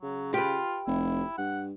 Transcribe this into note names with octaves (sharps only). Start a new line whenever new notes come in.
C#3 F#3
F4 G4 B4
F1 E4
G2 F#5